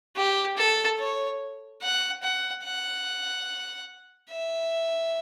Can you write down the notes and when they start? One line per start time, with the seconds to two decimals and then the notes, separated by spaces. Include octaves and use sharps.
0.16 G4
0.57 A4
0.99 C#5
1.82 F#5
2.23 F#5
2.64 F#5
4.30 E5